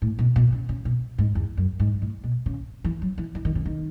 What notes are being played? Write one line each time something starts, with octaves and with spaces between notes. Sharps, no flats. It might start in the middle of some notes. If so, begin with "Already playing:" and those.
A2
B2
B2
C#3
C#3
B2
G#2
E2
F#2
G#2
A2
B2
C#3
E3
F#3
E3
E3
D#3
C#3
D#3